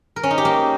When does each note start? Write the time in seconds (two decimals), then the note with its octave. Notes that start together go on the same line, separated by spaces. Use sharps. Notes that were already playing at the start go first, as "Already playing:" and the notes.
0.16 A#4
0.23 C#4
0.31 D#4
0.38 G4
0.45 A#3